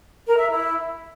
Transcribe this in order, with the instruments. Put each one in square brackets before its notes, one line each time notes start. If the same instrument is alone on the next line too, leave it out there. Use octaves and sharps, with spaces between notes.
[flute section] A#4
E5
E4